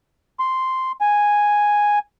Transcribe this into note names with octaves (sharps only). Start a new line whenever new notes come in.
C6
G#5